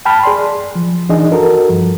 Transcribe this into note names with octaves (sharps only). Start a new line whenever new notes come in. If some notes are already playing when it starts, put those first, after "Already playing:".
G5 A5 B5 F6
G#4 D5 C6
F3
E3 D4 D#4 G#4 D#5
F#4 A4 A#4
G2 F3